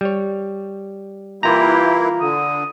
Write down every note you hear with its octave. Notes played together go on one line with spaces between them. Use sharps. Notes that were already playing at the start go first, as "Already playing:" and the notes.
G3 C#5
E3 A#3 E4 F4 G4 A#5
D3 D#6